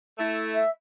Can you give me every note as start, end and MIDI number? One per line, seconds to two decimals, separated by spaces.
0.18 0.59 57
0.18 0.59 64
0.54 0.69 76